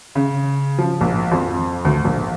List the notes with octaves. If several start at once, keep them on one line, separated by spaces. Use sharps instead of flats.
C#3
F3
A#1
F2
D2
A#1